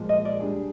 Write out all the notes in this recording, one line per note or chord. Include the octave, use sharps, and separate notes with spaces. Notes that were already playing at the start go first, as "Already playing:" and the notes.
Already playing: A#2 F3 G#3
D#5
D5
G3 D4 G#4